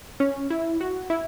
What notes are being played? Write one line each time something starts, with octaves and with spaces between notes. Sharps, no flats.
C#4
E4
F#4
E4